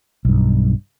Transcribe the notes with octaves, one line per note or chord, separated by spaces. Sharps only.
B1 G2